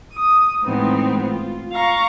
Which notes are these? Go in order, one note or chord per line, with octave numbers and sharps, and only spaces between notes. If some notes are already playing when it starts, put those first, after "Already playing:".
D#6
A2 E3 G#3 B3 C4 D#4
F4
F5 A#5 C#6